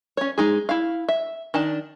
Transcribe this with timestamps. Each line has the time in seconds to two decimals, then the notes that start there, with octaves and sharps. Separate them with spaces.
0.17 C#4 C#5
0.38 G#3 D#4 G#4
0.69 E4 F5
1.09 E5
1.54 D#3 D4 A5